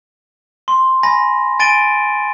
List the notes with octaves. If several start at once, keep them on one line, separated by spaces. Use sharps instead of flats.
C6
G#5 B5 A#6
G#5 A6 D7 D#7 G7